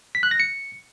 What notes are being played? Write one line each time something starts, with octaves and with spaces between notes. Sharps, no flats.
B6
F#6
A#6
C#7